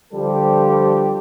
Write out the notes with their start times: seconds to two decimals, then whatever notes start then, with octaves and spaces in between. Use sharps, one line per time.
0.14 D3 F3 G3 G4 A4 C5